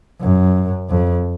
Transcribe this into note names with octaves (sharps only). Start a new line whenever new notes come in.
F#2
F2